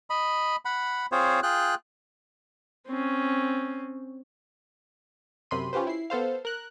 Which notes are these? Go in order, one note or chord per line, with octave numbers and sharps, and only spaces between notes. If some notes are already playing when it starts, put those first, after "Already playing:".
D#5 B5
F#5 B5
C4 F4 G#4 C5 C#5
F4 G#4 G5 F#6
C4 C#4
F#2 C3 B5 C6 D#7
C#4 F4 G4 B4 C5
E4 C7
B3 A4 C5 F5
A#4 F#6